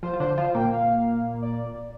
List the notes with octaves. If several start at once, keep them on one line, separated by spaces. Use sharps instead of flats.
F3 F4 C5
F4
D3 D4 C5
F3 F4 C5
A#2 A#3 G5
F5
D5